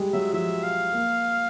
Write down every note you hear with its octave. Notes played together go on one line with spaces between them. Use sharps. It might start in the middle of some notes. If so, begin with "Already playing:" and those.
Already playing: G3 G#3
F#3 E5
F3 E5
F5
A#3